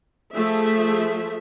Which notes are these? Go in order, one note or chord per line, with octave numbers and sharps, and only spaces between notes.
F3 A3 G#4 E5